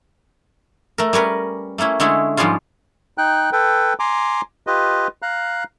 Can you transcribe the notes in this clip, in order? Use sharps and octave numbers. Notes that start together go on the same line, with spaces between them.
A3 A#4
G3 C#4 A#4 B4
A3 A#3 C#4 E4
D3 G#3 A3 C#4 E4
G#2 F3 G3 G#3 C#4 F4
D#4 G5 F#6
A4 B4 G5
G#5 A#5 C6 D6
F4 G4 B4 D#5
F5 A#5 F#6